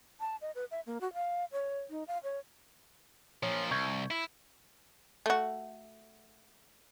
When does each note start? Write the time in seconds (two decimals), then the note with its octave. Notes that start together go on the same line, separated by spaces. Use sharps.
0.20 A5
0.41 D#5
0.55 B4
0.71 E5
0.86 A#3
1.01 F#4
1.14 F5
1.52 C#5
1.90 D#4
2.08 F5
2.23 C#5
3.43 A#2 F3 C#5
3.71 C2 C#6 G6 G#6
4.11 E4
5.26 A3 F#4